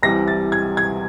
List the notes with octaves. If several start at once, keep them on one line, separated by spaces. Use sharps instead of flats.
C2 C3 E3 G3 A#6
A6
G#6
G#6